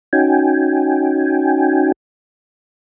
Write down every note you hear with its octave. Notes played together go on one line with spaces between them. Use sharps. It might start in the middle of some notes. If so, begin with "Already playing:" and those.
C#4 D#4 F#4 G5 G#5